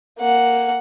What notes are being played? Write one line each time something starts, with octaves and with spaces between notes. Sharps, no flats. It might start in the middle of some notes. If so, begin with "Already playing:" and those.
A#3 F#5